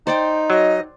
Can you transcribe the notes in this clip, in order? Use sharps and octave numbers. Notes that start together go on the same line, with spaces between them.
D#4 C5 D5 G5
F#3 D#5